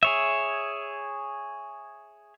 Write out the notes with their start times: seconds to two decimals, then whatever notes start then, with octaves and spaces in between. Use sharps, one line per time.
0.03 G#4 C#5 E5